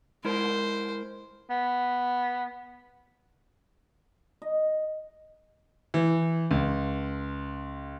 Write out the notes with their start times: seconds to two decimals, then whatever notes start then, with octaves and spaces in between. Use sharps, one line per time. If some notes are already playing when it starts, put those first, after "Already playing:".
0.25 G#3 E4 A#4 C5
1.50 B3
4.42 D#5
5.94 E3
6.51 C#2